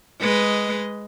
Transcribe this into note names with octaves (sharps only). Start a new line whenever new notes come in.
G#3 B4 D#5